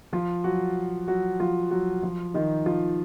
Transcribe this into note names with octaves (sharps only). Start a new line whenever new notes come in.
F3 F4
F#3 F#4
F#3 F#4
F3 F4
F#3 F#4
F3 F4
D#3 D#4
F3 F4